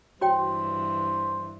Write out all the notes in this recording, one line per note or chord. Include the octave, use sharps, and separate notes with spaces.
G2 E3 F#4 C5 C#5 G5